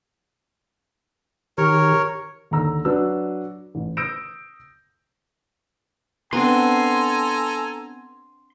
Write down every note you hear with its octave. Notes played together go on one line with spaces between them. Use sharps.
D#3 G4 A#4 C#5
D#2 D3 A#5 E6
F#3 D4 B4 E6
A1
D#6 E6 G6 A#6 D7 E7
B3 C4 D4 A4 G#5 A#5 C6